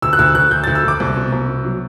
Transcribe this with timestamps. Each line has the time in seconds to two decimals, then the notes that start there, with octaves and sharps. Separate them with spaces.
0.02 D2 E6
0.13 F#6
0.19 D2 E6
0.35 D2 F#6
0.51 D2 G6
0.64 D2 A6
0.75 E6
0.84 D2 D6
1.00 C2
1.16 B2
1.32 C2
1.49 B2
1.65 F#3